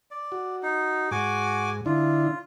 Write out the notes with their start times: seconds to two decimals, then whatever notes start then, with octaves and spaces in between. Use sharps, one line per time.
0.11 D5
0.32 F#4
0.63 D#4
1.11 G#2 F#4 G#5 D6
1.86 D3 D4 E4 F4